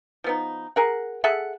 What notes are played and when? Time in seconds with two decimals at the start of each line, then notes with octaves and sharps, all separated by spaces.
0.24 F3 B3 D#4
0.76 G#4 A#4 F#5
1.24 G#4 A4 E5 F#5